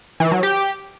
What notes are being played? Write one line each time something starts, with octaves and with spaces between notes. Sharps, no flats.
E3
F#3
G4